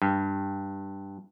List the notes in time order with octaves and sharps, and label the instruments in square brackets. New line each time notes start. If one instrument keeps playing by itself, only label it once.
[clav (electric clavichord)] G2